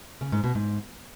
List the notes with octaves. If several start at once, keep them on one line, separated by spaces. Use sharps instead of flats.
C#3
G#2
B2
G#2